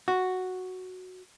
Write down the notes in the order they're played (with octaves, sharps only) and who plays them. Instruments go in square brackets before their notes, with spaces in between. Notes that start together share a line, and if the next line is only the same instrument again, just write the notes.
[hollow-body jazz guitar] F#4